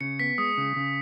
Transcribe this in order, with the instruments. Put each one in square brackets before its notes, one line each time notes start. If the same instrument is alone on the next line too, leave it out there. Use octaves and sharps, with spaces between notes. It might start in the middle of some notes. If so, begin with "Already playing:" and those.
[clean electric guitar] C#3 [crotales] C#7
[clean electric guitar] B3 [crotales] B6
[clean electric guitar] G#3 [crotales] D#6
[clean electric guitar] C#3
C#3